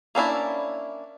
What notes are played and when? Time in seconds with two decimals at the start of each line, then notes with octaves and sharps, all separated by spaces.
0.15 A#3 C#4 D4 E4